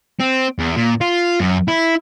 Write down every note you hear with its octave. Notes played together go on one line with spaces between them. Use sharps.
C4
E2
A#2
F4
F#2
E4